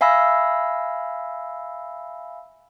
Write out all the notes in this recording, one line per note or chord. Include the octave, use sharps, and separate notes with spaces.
E5 F5 G#5 B5 E6 A#6